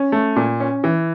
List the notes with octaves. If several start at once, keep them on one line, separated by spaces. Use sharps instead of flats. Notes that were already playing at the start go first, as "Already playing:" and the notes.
Already playing: C#4
A3
A#2
C#4
E3